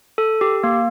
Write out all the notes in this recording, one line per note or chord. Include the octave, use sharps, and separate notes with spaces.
A4
G4
A#3